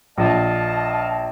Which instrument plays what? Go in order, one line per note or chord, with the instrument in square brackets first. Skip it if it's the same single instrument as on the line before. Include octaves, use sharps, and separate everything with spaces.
[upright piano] A#1 [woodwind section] D#5 F5 A5